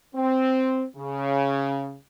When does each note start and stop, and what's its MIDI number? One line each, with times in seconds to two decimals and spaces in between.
0.15 0.84 60
0.96 1.94 49